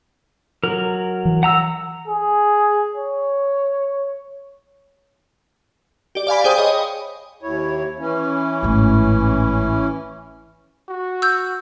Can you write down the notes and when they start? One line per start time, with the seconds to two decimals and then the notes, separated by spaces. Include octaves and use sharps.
0.64 F#3 A#4
1.25 E3
1.43 F#5 A#5 E6
2.08 G#4
2.95 C#5
6.15 G4 D5
6.27 D5 F5 G#5 B5
6.44 G#4 C5 G5 D#6
6.58 C#5 D#5
7.43 D#2 E4 C#5
7.99 E3 C#4 E4
8.63 G#1 A2
10.89 F#4
11.22 E6 G6